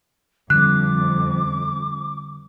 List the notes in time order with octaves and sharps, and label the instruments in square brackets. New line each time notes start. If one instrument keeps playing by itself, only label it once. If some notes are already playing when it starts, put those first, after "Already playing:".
[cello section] F2 [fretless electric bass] D3 G3 [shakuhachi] D6 [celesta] F#6